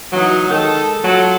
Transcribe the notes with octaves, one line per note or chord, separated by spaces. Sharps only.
E3 F#3 D#4 F#4
D#3 G#3 A4
F#3 F4 A4